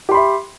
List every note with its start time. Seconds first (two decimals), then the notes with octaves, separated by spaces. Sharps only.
0.09 G4
0.11 C6
0.14 B5
0.17 E5